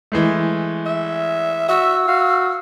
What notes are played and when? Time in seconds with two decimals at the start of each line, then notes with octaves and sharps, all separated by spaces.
0.12 E3 G#3 A3
0.86 E5
1.69 F#4 E5 E6
2.08 F#4 F5